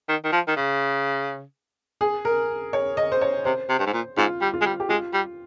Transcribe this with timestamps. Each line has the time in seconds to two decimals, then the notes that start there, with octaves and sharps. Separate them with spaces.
0.08 D#3
0.24 D#3
0.32 F3
0.48 D#3
0.56 C#3
2.01 G#4
2.25 A#4
2.73 C#5
2.97 D#5
3.12 C5
3.21 C#5
3.45 C3 C5
3.69 C3
3.79 G2
3.86 G#2
3.93 A#2
4.17 G#2 F4
4.41 G3
4.54 F4
4.61 G#3
4.65 G3
4.80 G4
4.89 G#3 F4
5.14 G3